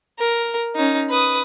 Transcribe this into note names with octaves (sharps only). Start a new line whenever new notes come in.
A#4
C#4 D#4
B4 D#6